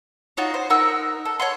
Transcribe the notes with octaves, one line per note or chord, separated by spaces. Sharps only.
D#4 F4 F#4 C#5
C5
D#4 A#4 F#5 E6
A4
C#5 F#5 C6